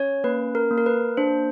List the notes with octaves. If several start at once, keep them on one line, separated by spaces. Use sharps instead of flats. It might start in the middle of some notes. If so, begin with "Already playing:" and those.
Already playing: C#4 C#5
A#3 B4
A#4
A#3
A#4
B4
D4 C5